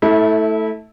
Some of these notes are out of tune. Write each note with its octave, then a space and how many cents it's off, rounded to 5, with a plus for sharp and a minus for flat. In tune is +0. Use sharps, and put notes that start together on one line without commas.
A3 +0 E4 -25